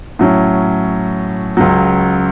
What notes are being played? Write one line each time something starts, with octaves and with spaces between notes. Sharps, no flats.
A2 F#3 C#4
C#2 C#3 F#3